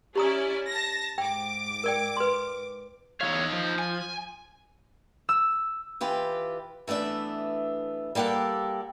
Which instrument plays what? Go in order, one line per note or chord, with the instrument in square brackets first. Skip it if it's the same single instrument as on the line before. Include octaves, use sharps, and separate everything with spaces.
[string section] C#4 E4 D5 [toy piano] G4 A#5 D#6
[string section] A5 A#6
[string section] G#2 D6 [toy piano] G5
[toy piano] A#4 D5 G5
B4 C6
[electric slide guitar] E2 E3 C#5 [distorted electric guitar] D#4 F5
[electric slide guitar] F3
[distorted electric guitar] G#5
[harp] E6
[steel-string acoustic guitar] E3 F4 G4 B4
E3 A3 B3 D4 E5
G3 A#3 G4 A4 F#5